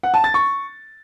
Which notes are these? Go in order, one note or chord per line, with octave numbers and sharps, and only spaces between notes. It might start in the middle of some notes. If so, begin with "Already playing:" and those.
F#5
A5
A6
C#6